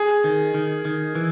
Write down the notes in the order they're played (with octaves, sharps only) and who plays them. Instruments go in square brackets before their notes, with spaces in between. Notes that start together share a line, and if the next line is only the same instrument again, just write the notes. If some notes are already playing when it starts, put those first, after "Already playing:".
Already playing: [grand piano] G#4
[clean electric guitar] D#3
D#3
D#3
E3